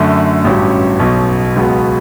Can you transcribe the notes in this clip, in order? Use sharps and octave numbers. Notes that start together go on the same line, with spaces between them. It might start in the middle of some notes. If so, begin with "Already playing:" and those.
Already playing: F#2 D3 A3
A1 G2 F#3 C#4 G4
B1 B2 F#3
C#2 B2 F#3 B3